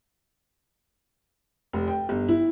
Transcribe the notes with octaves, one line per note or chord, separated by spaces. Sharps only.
F1
G5
G1
E4